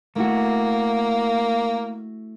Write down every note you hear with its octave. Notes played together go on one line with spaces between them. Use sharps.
A3 A#3 E4 F#4